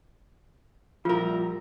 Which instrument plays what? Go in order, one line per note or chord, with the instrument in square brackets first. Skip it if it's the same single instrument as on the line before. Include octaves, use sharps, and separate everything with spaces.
[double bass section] A#2 G3 [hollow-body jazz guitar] F3 A#4 [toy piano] F4 [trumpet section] E5 A#5